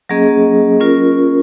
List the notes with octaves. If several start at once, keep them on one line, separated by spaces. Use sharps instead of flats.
F#3 A#3 C#4 G#4 D#5
C#4 F4 A#4